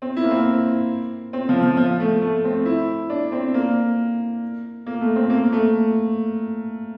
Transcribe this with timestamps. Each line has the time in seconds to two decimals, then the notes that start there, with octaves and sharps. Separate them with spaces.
0.02 C4
0.17 E4
0.24 A#3
0.31 C4
1.33 C4
1.49 F3
1.63 F3
1.77 F3
2.00 A3
2.22 A3
2.44 C4
2.66 E4
3.10 D4
3.32 C4
3.54 A#3
4.87 A#3
5.01 A3
5.16 C4
5.30 A#3
5.43 A#3
5.52 A3